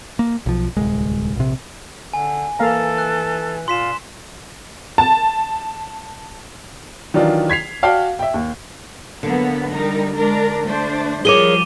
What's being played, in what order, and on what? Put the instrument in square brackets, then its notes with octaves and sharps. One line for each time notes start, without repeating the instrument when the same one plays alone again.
[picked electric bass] A#3
B1 F3
D1 C2 G#3
A#1 C3
[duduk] D3 [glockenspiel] G#5
[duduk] E3 [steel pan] A#3 F5 A#5 [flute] A4
[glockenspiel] F#6
[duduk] A#2 [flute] F4 [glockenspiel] C6 B6 E7
[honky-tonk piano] A5
[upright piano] D#3 E3 F#3 D4 F4
G#6 B6 C7 F7
F#4 D5 F5 G5 A5
E5 G5
D#2
[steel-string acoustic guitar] D3 [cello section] F#3 A#3 B3
[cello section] G3 D#4 A#4
G#3 D4 A#4
A3 D4 C5
[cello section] F3 G3 [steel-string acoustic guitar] G#4 A#4 C#5 [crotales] D6 D#7 G7